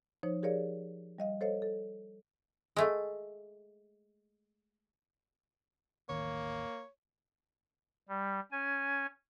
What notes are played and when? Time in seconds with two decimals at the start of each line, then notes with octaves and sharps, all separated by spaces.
0.23 F3 D#4 C5 C#5
0.43 G4 G#4 A#4 C#5 D5 F5
1.18 G3 D#5 F5
1.41 A4 C5 C#5 D#5 F5
1.62 A4
2.76 G#3 A3
6.09 D#1 A1 D#3 A#3 C#5
8.09 G3
8.52 C#4 G#5